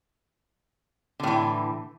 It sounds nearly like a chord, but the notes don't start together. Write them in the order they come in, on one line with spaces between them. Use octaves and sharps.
D3 A2 E3